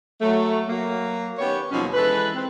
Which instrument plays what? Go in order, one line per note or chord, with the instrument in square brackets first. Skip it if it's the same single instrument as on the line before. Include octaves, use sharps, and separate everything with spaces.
[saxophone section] F#3 A3
F#3 A#3
D#3 B3 C#4 G4 C#5
D#2 B2 F3 F#3 C#4 F4
E3 G#3 A4 B4
C4